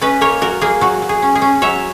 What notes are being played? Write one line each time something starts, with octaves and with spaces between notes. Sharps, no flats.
C#4 B4 D#5
A#3 A#4 C#5
F#3 F#4 A#4
A#3 G#4
F#3 F#4
F#3
G#4
C#4
G#4
C#4
F#3 C#5 E5